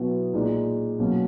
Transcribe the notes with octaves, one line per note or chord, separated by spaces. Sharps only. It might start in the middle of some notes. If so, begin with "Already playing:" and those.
Already playing: B2 F#3 B3 E4
A#2 G#3 D#4
B2 F#3 A#3 C#4